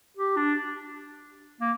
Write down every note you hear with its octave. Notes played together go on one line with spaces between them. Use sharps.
G4
D4
A#3